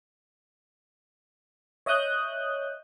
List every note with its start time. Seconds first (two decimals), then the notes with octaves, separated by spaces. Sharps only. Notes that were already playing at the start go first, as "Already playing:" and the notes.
1.86 C#5 D#5 E5 D#6 F#6 G6